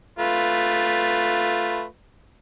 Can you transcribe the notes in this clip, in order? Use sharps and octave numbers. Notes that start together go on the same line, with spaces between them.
A3 F4 B4